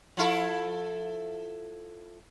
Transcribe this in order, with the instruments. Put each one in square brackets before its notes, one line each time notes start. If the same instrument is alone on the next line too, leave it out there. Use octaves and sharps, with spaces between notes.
[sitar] F3 E4 A4